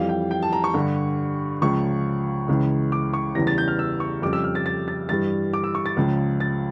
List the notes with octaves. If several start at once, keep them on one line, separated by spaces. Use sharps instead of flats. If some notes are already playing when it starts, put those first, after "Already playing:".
Already playing: F2 E3 G3 F5
G5
G5
A5
A#5
C#6
G2 D3 G3
C#2 C#3 F3 C#6
C#2 C#3 E3
D6
C#6
E2 C#3 E3 G3 A#6
A6
G6
F6
E6
C#6
F2 C#3 G3 D6
E6
F6
A6
A6
A6
G2 E3 G3 A6
D6
E6
C#6
A6
C#2 C#3 F3
A6